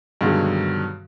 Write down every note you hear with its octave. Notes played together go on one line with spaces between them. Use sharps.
G2 B2 D3 D#3 F#3 G#3